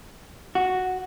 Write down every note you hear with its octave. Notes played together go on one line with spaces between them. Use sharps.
F#4